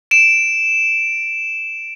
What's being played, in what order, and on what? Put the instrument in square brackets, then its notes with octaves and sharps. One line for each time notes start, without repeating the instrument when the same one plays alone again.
[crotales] D7 E7